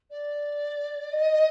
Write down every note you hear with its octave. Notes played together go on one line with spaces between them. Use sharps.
D5
D#5